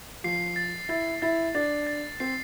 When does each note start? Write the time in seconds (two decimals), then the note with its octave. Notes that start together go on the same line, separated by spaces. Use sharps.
0.24 F3 C7
0.56 A6
0.89 E4 A6
1.22 E4 A6
1.55 D4 A6
1.87 A6
2.20 C4 C7